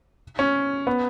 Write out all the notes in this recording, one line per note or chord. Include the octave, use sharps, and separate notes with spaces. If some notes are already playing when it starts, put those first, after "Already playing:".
C#4
B3